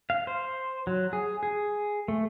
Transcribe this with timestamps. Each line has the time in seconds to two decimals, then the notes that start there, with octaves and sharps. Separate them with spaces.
0.10 F5
0.27 C5
0.87 F#3
1.13 G#4
1.43 G#4
2.08 A3